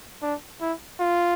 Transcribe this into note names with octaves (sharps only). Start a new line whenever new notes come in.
D4
E4
F4